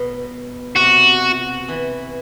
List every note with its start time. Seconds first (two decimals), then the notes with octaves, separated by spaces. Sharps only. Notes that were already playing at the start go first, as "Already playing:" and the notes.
Already playing: B2
0.76 C3 F#4
1.68 E3